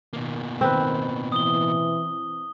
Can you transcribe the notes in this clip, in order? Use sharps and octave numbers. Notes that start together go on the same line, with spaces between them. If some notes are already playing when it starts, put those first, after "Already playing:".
B2 D#3 A#3
D#3 C4 B4
E3 D#6 G7